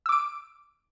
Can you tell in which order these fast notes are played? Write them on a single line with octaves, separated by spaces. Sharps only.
E6 D6 D7